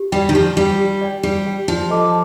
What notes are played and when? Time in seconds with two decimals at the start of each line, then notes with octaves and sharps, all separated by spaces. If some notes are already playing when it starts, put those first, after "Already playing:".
Already playing: G4
0.12 G3 D5 G5
0.29 D#3
0.34 F3 G4
0.57 G3 D5 G5
0.79 G4
1.01 D5 G5
1.23 G3 G4
1.46 D5 G5
1.68 F3 F4
1.90 A4 D#5 A5 D6